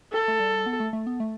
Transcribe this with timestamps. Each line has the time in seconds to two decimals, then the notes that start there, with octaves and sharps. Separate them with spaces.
0.13 A4
0.28 A3
0.40 G3
0.66 B3
0.80 A3
0.93 A3
1.07 B3
1.20 A3